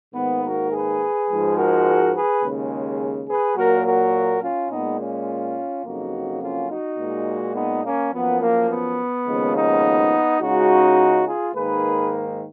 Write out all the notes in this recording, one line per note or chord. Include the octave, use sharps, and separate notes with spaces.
G#2 D#3 A#3 B3
F#4 A#4
G#4 B4
G#2 F3 G#3
F#4 A#4
G#4 B4
D#2 C#3 G#3
G#4 B4
A#2 F#3 A#3 F#4 A#4
F#4 A#4
C#4 F4
A#2 G#3 B3 D#4
C#4 F4
F2 C#3 F#3 A#3 D#4 F#4
C#4 F4
D#4 F#4
A#2 G#3
B3 D#4
A#3 C#4
F#2 F3 A#3 B3
A#3
B3
D#2 C#3 F3 G#3
B3 D#4
C#2 C#3 G#3 D#4 F#4
F4 G#4
G#2 D#3 A#3 G#4 B4